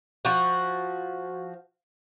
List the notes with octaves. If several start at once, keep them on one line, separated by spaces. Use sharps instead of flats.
F3 F#4